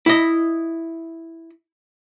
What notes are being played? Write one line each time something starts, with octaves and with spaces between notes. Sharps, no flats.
E4 D#5